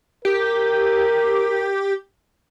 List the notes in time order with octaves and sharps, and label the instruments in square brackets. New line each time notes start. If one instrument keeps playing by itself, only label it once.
[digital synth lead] G4 [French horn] A#4